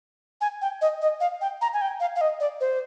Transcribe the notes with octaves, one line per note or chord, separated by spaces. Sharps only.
G#5
G5
D#5
D#5
F5
G5
A#5
G#5
G5
F5
F5
D#5
D5
C5